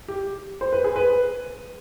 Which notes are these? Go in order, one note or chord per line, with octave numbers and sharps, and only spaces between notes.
G4
C5
B4
G#4
B4